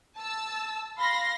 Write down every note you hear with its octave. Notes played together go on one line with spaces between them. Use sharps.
A5 E6
F5 B5 C6 A#6